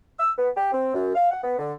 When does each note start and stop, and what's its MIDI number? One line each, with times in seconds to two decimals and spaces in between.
0.18 0.31 88
0.37 0.48 59
0.55 0.70 67
0.72 0.89 60
0.93 1.12 42
1.14 1.30 77
1.31 1.41 78
1.43 1.57 59
1.59 1.73 50